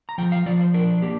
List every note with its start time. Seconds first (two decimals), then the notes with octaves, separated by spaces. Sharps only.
0.09 A#5
0.18 F3 G5
0.32 F5
0.46 F3 D5
0.61 C5
0.74 D4 A#4
1.02 A#3 G4